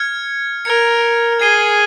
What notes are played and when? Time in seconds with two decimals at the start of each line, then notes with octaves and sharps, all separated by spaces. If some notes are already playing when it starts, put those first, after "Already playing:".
Already playing: F6 G#6 C#7
0.65 A#4 F6 G#6 C#7
1.40 G#4 G#6 C7 D#7 G7